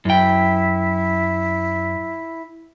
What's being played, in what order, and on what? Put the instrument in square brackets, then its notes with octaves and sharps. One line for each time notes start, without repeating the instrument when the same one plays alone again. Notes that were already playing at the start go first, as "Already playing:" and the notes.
[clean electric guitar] F#2 G5 [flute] E4